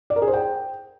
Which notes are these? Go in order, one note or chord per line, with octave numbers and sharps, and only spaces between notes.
D5
A#4
G#4
C5
G5